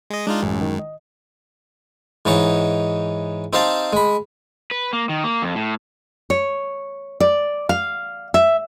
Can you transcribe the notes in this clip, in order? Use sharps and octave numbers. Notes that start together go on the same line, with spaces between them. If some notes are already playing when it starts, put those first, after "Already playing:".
G#3 D#5
G#3 D4 D#4 F4
A1 F#2
D#3
D#5
G#2 E3 D#4 C#5
C4 D#4 G4 C5 F5 A5
G#3 B5
B4
A#3
D#3
A#3
F2
A2
C#5
D5
F5
E5